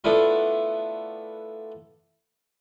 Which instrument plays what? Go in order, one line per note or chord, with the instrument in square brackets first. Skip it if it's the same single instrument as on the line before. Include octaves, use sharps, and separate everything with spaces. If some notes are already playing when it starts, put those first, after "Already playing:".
[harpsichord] A3 B3 D4 E4 F4